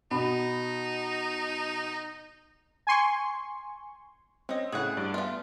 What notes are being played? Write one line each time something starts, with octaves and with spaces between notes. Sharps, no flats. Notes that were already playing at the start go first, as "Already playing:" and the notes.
B2 D#4 B5
G#5 C6 C#6
C4 C#4 D#5
A2 C#3 G#4 F#5
G2 D5
A3 B3 F4